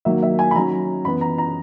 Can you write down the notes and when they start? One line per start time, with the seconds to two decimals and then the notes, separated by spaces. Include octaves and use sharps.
0.05 D#3 F#3 A#3 E5
0.23 E5
0.39 G#5
0.51 B5
0.55 D#3 F#3 C#4 A#5
1.05 F#2 E3 B3 B5
1.21 A#5
1.38 A#5